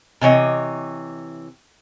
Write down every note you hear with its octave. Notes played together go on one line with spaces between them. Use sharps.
C3 E3 C#5 D#5